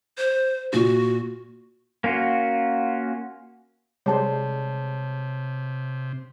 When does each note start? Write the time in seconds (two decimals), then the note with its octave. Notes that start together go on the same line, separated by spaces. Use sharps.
0.18 C5
0.73 A#2 F4 F#4
2.04 A#3 C#4 F4 F#4
4.06 C3 G3 G#3 C5 C#5 A5